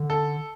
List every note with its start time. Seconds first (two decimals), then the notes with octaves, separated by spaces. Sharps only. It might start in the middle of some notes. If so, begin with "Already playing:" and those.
Already playing: D3
0.10 A4